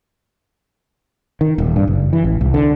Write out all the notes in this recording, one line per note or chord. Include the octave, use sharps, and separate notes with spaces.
D#3
D#1
G2
F#1
E3
A1
C2
D3